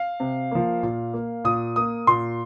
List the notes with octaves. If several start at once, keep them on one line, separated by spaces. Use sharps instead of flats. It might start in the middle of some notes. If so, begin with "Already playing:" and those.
Already playing: F5
C3
F3 A#3
A#2
A#3
A#2 D#6
A#3 D#6
A#2 C6